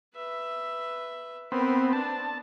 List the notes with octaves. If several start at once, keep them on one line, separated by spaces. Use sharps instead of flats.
B4 E5
B3 C4 A#4 B4
D4 A5